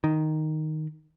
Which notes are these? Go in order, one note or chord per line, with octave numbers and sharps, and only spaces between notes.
D#3